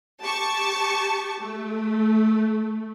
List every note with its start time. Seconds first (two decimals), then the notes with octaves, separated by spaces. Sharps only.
0.22 G4 A5 C#6
1.41 A3